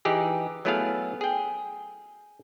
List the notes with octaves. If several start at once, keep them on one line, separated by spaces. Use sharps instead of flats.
E3 D#4 G4 G#4
F#3 A3 B3 E4 G#4 F5
G#4 G5